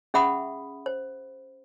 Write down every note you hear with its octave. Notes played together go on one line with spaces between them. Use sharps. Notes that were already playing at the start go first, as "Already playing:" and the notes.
C#4 G#4 E5 F#5 B5 D#6
C5